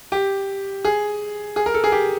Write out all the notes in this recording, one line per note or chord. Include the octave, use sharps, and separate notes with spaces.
G4
G#4
G#4
A#4
A4
G#4
G4